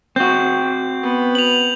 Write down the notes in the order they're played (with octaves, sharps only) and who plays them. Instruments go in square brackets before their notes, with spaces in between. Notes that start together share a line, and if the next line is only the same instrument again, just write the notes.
[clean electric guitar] C4 F#4 [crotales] G6
[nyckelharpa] B3 B4
[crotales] F7 F#7